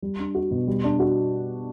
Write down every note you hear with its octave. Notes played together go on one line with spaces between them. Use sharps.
G3
D4
F#4
B2
G3
D4
F#4